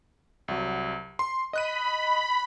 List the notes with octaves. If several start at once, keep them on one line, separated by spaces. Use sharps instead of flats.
C2 F#3
C6
D#5 B5 F#6 D#7